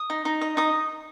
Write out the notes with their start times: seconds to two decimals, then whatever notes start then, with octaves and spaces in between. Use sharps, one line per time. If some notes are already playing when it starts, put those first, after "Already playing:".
Already playing: D#6
0.10 D#4
0.25 D#4
0.41 D#5
0.57 D#4 D#6